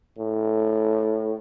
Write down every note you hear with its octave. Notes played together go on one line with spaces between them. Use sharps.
A2